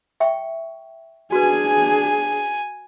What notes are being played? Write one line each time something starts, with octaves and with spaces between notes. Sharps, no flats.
E5 G5 C#6
D4 F#4 G#4 B4 G#5